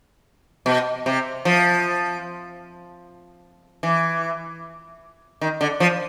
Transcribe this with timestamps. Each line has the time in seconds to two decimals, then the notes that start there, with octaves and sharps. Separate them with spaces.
0.66 B2
1.06 C3
1.45 F3
3.83 E3
5.41 D#3
5.61 D3
5.80 F3